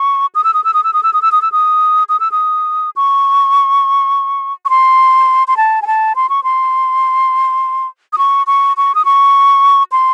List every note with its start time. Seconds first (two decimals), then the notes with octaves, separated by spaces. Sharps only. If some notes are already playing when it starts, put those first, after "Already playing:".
Already playing: C#6
0.35 D#6
0.44 E6
0.54 D#6
0.64 E6
0.74 D#6
0.84 E6
0.93 D#6
1.03 E6
1.13 D#6
1.22 E6
1.32 D#6
1.42 E6
1.52 D#6
2.09 D#6
2.20 E6
2.32 D#6
2.96 C#6
4.65 C#6
4.70 C6
5.48 C6
5.57 A5
5.82 G#5
5.87 A5
6.16 C6
6.29 C#6
6.44 C6
8.13 D#6
8.18 C#6
8.47 C#6
8.77 C#6
8.95 D#6
9.05 C#6
9.92 C6